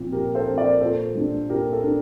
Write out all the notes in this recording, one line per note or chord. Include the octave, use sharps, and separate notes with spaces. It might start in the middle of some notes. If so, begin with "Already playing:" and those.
Already playing: A#2 F3 C4
A#2 G4 A#4
A4 C5
F3 C4
A#4 D5
A#2 A4 C5
G3 D4
A#2 G4 A#4
A4
D4